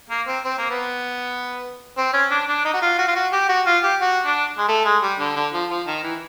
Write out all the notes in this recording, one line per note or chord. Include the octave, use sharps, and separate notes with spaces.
A#3
C4
C4
A#3
B3
C4
C#4
D4
D4
D#4
F#4
F4
F#4
F4
F#4
G4
F#4
F4
G4
F#4
D4
G#3
A3
G#3
G3
D3
D3
F3
F3
D#3
E3